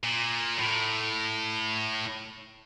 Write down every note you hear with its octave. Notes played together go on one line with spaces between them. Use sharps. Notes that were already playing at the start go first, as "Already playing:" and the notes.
A#2
A2